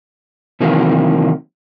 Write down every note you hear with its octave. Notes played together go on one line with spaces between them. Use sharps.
C3 D#3 E3 F#3 A#3 C4